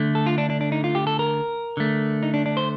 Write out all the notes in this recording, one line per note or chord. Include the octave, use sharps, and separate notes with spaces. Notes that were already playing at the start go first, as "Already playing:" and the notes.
Already playing: D3 A3
A4
F4
D4
D4
D4
D#4
F4
G4
A4
A#4
D3 A3
D#4
D4
D4
C5